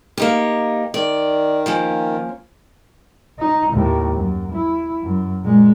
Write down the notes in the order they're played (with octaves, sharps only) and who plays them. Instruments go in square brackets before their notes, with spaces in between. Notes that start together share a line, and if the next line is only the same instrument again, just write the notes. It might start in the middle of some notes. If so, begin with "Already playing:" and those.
[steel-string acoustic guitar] A#3 D#4 G4
[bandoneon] D#3 [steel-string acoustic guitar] D5
[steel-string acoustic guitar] F3 A#3 C#4
[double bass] D#4
D#2 A2
F#2
E4
F#2
A#2 G#3